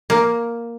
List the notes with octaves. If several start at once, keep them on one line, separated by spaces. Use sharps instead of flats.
A#3